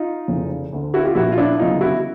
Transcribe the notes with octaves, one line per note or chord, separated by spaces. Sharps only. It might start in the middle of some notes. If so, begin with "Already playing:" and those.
Already playing: D#4 F4
F1 F2 C#3 E3
D2 D3
E4 F#4
F4 G4
A#1 A#2 E4 F#4
F4
D4 E4
G1 F#2 C#3 E3 D#4 F4
E4 F#4